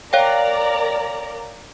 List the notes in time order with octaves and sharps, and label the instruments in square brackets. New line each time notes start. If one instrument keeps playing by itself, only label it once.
[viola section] A#4 D5 A#5 [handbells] C#5 F5 G5